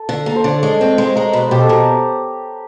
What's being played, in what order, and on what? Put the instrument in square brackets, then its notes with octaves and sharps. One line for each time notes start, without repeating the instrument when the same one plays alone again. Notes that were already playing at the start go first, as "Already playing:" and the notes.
Already playing: [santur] A4
[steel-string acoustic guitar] D3
[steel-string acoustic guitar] A#3 [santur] A4
[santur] C5
[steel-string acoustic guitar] D3 [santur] C#5
[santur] D5
[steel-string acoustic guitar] G#3 [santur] C#5
[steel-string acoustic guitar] C4
[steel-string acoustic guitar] G#3 [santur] C5
[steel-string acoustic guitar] G#3 [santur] A#4
[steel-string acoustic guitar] B2 [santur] B4
[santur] C5
[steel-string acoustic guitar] B2 [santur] G4
[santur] A4
[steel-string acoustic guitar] B2 [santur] A#4